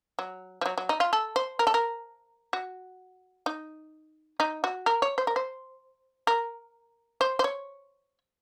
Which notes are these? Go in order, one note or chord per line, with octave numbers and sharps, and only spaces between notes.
F#3
F3
F#3
F#3
D#4
F4
A4
C5
A#4
A4
A#4
F#4
D#4
D#4
F#4
A#4
C#5
C5
A#4
C5
A#4
C5
C5
C#5